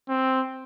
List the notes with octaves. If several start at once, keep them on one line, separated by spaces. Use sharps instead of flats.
C4